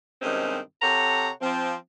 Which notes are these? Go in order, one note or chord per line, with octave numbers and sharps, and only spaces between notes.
G2 C3 D#3 G#3 C4 C#4
C3 A4 C#5 F#5 A#5
F3 C4